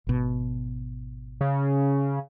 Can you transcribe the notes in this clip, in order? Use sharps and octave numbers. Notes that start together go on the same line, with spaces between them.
G#1 B2
C#3